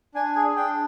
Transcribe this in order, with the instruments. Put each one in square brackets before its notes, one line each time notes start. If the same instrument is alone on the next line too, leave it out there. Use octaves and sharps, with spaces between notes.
[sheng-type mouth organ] D4 G#5
G#4 G#5
D4 G5